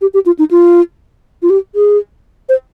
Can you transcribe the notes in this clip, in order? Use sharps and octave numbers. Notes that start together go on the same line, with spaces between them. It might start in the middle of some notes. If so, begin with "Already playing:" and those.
G4
G4
F4
D#4
F4
F4
G4
G#4
C5